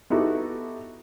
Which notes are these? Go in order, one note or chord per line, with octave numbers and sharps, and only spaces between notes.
B3 D#4 E4 F#4 G4 A4